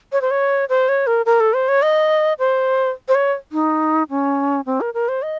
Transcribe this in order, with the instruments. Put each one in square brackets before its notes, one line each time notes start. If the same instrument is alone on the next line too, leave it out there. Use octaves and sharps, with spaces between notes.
[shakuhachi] C#5
C5
C#5
C5
C#5
A#4
A#4
A4
C5
C#5
D#5
C5
C5
C#5
D#4
C#4
C4
A#4
A#4
C5
D#5